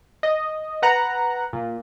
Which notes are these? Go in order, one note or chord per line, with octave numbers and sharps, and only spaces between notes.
D#5
B4 F#5 A#5 F#6
A#2